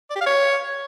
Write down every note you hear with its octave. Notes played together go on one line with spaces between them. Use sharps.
D5
G4
F5
C#5